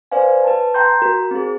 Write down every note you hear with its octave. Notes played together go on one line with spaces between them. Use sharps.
B4 C5 D5 F5 G#5
B4 A5
G5 A#5 C6 G6
F#4 A#4
C4 G#4